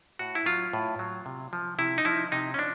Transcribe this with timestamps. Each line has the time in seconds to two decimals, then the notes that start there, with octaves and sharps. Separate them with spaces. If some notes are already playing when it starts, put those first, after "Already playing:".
0.19 A2 F#4
0.35 E4
0.46 F#3 F4
0.73 A2
0.99 F#3
1.26 C3
1.53 F3
1.78 C3 E4
1.98 D#4
2.05 F3 E4
2.32 C3 D#4
2.54 C#4
2.59 F3 D4